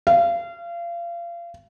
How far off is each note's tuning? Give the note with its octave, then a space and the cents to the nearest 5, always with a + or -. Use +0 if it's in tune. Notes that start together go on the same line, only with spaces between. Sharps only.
F5 -30